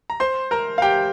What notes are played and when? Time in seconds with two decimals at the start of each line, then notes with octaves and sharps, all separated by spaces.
0.10 A#5
0.20 C5 C6
0.51 A#4 A#5
0.78 F5
0.82 G4 G5